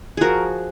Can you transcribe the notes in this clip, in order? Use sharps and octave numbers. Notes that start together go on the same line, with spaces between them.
F3 F#4 G#4 A#4